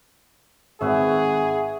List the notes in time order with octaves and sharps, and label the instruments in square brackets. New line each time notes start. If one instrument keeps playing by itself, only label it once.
[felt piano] G#1 [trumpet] G#4 [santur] B4 C#5 E5 [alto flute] F#5